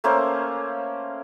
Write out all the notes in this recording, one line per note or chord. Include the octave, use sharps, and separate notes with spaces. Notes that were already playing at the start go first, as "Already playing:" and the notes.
A3 A#3 C#4 C5